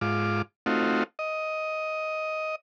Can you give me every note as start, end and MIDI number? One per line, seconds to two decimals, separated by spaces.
0.01 0.42 44
0.01 0.42 65
0.01 0.42 86
0.66 1.03 57
0.66 1.03 60
0.66 1.03 63
0.66 1.03 65
0.66 1.03 66
1.19 2.55 75